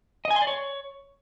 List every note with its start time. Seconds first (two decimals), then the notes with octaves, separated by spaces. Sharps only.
0.25 D#5
0.31 G#5
0.36 C6
0.42 D5
0.47 C#5